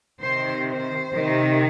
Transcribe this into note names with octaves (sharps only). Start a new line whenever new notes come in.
C3 D#3 C5
C5
C3 D#3